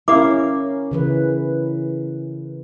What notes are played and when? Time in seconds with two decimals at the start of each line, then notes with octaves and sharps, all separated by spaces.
0.08 C#4 E4 A#4 F5 D6
0.91 C#3 E3 B4